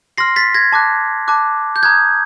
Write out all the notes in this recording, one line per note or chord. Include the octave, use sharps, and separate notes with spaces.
C6 F6 A#6 C7
A6 B6
G#6 A#6
A5 D6 F#6
A5 D6 F#6
G6
A#5 D#6 F#6 G#6